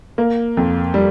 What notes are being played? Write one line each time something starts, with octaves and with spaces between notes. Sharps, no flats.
A#3
F2
G3